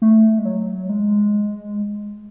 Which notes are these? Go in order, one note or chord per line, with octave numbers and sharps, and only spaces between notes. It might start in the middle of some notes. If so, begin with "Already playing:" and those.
A3
G#3
F#3
G#3